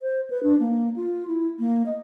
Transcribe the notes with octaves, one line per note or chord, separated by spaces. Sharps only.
C5
B4
D4
A#3
F4
E4
A#3
D#5